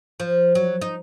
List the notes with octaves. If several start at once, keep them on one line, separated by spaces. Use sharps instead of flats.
F3
F#3
D#4